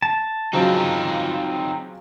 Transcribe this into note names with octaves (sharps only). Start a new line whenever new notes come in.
A5
C#3 F3 F#3 C4 D#4 F4